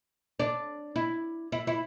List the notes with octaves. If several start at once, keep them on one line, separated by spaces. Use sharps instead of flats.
D4
E4
E4
E4